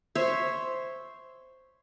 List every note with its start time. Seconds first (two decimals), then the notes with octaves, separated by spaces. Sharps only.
0.15 C5 C#5 E5